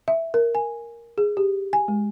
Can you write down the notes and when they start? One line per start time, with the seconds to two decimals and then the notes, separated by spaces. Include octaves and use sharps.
0.08 E5
0.34 A#4
0.55 G#5
1.18 G#4
1.37 G4
1.73 G#5
1.88 G#3